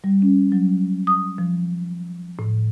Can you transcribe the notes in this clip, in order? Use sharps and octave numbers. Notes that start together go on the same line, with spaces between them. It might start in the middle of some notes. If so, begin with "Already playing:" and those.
G3
C#4
F#3
D#6
F3
A2